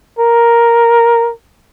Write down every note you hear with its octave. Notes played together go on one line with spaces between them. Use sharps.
A#4